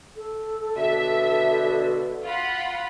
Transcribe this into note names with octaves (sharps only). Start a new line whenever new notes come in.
A4
B2 D3 E5
F4 F#5 B5